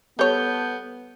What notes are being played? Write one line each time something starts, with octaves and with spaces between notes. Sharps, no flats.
G3 B3 A4 C#5 G6